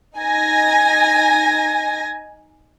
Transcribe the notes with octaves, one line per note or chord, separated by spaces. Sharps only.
D#4 G#5 G#6 A#6